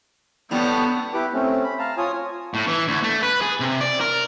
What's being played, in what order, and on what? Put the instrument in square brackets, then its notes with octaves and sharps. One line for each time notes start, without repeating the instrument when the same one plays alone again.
[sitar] A2 D3 G3 [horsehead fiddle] B3
[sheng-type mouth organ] E4 G4 B4 D6
A3 C4 C#4
B5
F5 A5 A#5
F4 C#5 G#5 D#6
[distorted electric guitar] A2
E3
D2
A3
B4
G#4
C3
D5
A#4